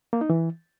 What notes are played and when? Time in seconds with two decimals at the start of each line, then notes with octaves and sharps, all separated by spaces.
0.13 A#3
0.21 D#4
0.30 E3